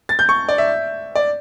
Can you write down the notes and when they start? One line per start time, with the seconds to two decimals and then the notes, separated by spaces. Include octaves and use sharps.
0.09 A6
0.19 G6
0.29 C#6
0.49 D5
0.58 E5
1.15 D5